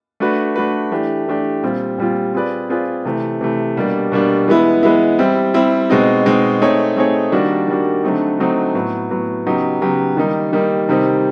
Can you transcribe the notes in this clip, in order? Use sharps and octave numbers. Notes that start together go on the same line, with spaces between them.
A3 D4 F#4 B4
A3 D4 F#4 B4
E3 A3 D4 G4
E3 A3 D4 G4
A#2 G3 C4 F4
A#2 G3 C4 F4
C4 F4 G#4 B4 D5
C4 F4 G#4 B4 D5
C3 E3 A3
C3 E3 A3
B2 G3 A#3 D4
B2 G3 A#3 D4
E3 G#3 B3 E4
E3 G#3 B3 E4
G3 C4 E4
G3 C4 E4
B2 G#3 C4 D#4
B2 G#3 C4 D#4
A3 C4 D#4 G#4 C#5
A3 C4 D#4 G#4 C#5
D#3 G3 A#3 D4 F#4
D#3 G3 A#3 D4 F#4
D3 F#3 A3 C4 D#4
D3 F#3 A3 C4 D#4
A2 F#3 B3
A2 F#3 B3
C#3 F#3 B3 D#4 G4
C#3 F#3 B3 D#4 G4
D#3 G3 A#3 D#4
D#3 G3 A#3 D#4
C3 D#3 G3 C4 D#4